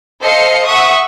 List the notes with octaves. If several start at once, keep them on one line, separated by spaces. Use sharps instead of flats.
A4 C5 D#5 F5 C7 C#7
E5 F#5 C#6 D#6